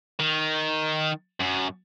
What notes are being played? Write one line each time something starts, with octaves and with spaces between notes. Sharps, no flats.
D#3
F#2